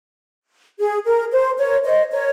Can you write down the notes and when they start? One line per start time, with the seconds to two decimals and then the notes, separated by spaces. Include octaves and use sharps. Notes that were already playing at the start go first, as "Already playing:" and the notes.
0.79 G#4
1.05 A#4
1.32 C5
1.58 A#4 C#5
1.84 C5 D#5
2.11 A#4 C#5